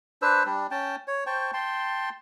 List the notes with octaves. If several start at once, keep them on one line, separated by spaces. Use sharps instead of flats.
D4 B4 C5 E6
G3 D4
C#4 G5 A5
C#5
C5 G5 A5 C#6
G5 A5 C6